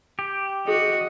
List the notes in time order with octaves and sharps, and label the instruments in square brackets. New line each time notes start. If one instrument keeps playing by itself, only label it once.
[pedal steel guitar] G4
[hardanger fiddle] F#4 [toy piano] G#4 [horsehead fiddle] D#5